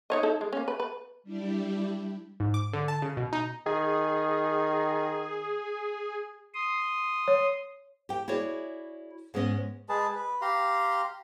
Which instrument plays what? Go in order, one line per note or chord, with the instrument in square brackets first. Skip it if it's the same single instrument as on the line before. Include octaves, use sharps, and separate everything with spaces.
[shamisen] D#4 C#5 D#5
D#4 E4 A4
G#3
A#3 C#4
B4
B4
[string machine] G3 D4 E4 G4
[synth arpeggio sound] G#2
D6
D3
A5
C#3
B2
D#4
[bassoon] D#3 [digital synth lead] G#4
[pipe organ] C6 D#6
[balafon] C#5
[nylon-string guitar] G4 G5
E4 F#4 G#4 C#5 D5
G#2 G#3 B3 C#4 D#5
[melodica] G#3 G#4 B4 A5
B4
G4 F5 A#5 C6